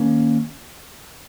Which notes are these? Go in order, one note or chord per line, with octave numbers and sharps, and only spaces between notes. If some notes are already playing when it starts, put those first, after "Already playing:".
Already playing: D#3 A#3 C#4